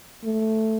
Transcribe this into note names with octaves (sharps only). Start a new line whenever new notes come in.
A3